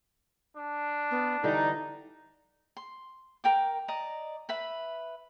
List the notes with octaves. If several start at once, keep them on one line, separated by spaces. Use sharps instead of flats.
D4
B3
D3 E3 G3 D#4 D5
C6
A#4 G5 D6
D5 D#5 A#5
B4 E5 B5